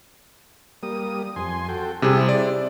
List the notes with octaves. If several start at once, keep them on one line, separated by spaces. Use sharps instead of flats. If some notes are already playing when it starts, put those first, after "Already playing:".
G3 A#3 D#6
F2 G#5 C6
F#4 A4 G5
C3 G3 C4 E4 G#4
D5